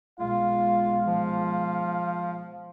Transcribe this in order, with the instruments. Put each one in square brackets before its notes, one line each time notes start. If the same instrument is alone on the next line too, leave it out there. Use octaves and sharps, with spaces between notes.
[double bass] B1 G#3 [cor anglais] F4 [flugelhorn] F5
[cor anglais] F3